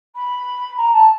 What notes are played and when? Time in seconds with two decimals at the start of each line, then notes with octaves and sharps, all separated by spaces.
0.15 B5
0.77 A#5
0.93 A5